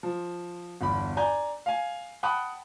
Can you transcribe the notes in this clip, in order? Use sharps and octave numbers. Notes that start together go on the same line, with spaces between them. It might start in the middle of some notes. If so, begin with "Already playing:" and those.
F3
G1 E2 B5
D5 G#5 A#5 G6
F5 G#5
F#5 G5 A5 B5 D#6 F#6